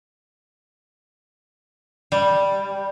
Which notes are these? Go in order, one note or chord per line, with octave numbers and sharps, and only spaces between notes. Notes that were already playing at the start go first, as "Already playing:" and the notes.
G3